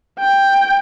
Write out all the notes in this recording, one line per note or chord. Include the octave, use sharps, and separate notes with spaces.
G5